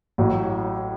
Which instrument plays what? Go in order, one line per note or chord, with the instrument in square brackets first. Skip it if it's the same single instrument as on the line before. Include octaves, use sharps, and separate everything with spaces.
[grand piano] A1 A2 F#3